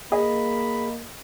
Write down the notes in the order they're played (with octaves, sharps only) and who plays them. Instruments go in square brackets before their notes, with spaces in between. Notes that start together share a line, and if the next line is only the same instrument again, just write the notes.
[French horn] A#3 [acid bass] G#4 [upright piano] D#5 [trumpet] B5